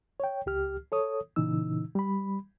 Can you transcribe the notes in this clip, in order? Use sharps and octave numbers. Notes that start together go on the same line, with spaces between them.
C#5 G5
C#2 G4 F6
A4 C#5 D#6
A#2 C#3 E3 D#4 E6
G3 B5